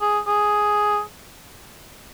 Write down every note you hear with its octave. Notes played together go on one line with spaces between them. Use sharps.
G#4
G#4